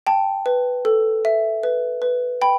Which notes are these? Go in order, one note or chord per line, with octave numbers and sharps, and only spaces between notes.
G5 A5
B4
A4
E5
B4
B4
G5 B5